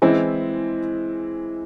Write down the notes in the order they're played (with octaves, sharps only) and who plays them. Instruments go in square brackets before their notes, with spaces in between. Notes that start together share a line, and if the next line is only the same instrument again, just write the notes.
[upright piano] E3 G#3 C4 E4